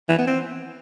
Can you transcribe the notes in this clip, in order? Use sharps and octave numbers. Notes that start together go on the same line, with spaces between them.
E3
B3
C4